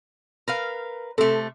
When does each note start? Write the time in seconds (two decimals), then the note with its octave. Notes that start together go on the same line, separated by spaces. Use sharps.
0.48 A#4 B4 F5
1.18 C3 A3 A4